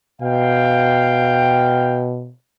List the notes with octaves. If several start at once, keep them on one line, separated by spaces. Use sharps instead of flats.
B2 F5 G5